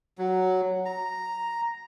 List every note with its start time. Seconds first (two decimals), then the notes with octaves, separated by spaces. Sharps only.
0.18 F#3
0.86 A#5